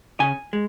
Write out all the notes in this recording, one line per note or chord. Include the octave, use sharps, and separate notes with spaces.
C#3 G#5
G#3